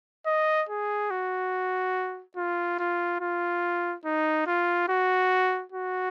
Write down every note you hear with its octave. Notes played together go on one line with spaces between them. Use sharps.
D#5
G#4
F#4
F4
F4
F4
D#4
F4
F#4
F#4